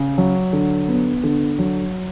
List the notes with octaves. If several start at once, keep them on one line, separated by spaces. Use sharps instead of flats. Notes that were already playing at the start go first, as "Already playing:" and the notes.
Already playing: C#3
F#3
D3
B3
D3
F#3